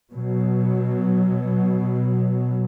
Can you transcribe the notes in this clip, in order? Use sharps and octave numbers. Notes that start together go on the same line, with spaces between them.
B2 F#3